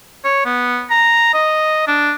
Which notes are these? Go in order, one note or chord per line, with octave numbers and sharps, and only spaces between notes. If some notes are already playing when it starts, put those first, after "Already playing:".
C#5
B3
A#5
D#5
D4